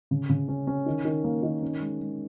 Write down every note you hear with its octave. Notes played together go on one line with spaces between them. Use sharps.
C#3
C#3
C#4
C#4
D#3
D#3
A#3
D#3
C#4
G#3
G#3